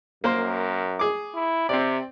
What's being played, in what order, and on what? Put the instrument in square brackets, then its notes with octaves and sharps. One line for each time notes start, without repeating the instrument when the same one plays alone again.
[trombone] F#2 [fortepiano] A#3 A#4 C5
[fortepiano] G#4 D6
[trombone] E4
[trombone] C3 [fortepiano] C4 D5